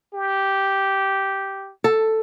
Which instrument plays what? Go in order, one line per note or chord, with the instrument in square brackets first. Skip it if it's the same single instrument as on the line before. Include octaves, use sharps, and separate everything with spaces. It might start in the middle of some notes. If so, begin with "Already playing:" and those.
[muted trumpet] G4
[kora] A4